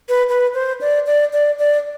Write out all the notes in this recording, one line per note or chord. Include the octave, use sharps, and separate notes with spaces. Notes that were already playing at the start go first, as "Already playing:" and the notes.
B4
B4
C5
D5
D5
D5
D5